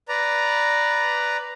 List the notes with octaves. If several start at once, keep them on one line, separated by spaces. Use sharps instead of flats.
B4 D5 A#5